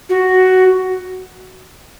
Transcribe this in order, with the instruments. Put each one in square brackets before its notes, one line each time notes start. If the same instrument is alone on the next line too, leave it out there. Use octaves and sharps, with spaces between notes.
[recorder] F#4